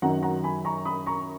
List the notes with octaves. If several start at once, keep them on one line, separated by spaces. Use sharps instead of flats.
F#2 D#3 F#3 F#5 A#5
F#5 A#5
G#5 B5
A#5 C#6
B5 D#6
A#5 C#6